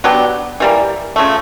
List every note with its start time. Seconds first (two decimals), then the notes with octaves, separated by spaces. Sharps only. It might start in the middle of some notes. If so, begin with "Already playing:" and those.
0.04 F#3 B3 D4 G4
0.60 E3 G3 A#3
1.16 C#3 F3 A3